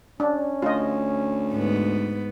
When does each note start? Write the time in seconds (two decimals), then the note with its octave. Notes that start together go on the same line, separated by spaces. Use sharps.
0.20 C#4 D4
0.62 D2 F4 D#5
1.52 G#2 B3